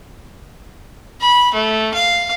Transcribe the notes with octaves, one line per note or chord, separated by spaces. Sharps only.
B5
A3
F5